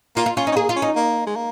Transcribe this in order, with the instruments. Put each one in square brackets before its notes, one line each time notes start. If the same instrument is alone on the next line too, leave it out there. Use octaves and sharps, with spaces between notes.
[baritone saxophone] A#3 [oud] F4
[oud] F4
[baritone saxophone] C#4 [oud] F4
[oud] D#4
[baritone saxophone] C#4
[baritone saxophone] A#3 [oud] G#4
[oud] F4
[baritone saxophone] C#4
[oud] D#4
[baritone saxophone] A#3
G#3
A#3